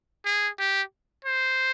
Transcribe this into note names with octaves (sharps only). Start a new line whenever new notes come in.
G#4
G4
C5